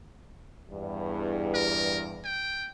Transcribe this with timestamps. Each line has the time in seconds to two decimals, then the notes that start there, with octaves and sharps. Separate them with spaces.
0.70 E2 G2
1.54 A#4
2.24 G5